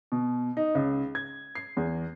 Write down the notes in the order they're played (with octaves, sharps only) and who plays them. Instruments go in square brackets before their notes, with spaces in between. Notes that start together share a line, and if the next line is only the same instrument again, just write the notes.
[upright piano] B2
D#4
C#2
G#6
C7
E2